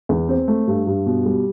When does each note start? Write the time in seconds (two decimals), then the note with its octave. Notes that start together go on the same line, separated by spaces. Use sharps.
0.09 E2
0.28 C4
0.48 A3
0.67 G2
0.87 G2
1.06 B2
1.26 G3